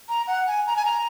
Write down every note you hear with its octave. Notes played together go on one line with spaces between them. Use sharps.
A#5
F#5
G#5
A#5
G#5
A#5